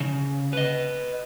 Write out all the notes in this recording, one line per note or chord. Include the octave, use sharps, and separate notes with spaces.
C#3
B4 D#5